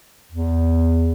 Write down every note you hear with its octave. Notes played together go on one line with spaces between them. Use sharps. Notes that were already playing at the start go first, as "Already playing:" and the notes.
E2